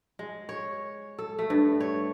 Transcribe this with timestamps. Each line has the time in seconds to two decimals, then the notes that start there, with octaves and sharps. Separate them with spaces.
0.19 G#3
0.49 C#5
1.19 A4
1.39 A3
1.50 G2
1.80 C#5